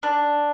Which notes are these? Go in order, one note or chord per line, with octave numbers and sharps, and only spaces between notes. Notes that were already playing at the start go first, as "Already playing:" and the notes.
D4